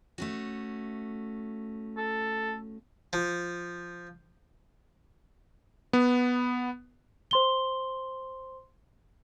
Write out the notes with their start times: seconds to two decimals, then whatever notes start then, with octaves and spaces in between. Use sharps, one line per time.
0.18 A3 C#4 F#4
1.97 A4
3.13 F3
5.93 B3
7.31 C5 C6 G7